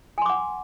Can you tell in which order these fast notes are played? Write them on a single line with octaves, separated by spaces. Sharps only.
G#5 C6 D6 F#5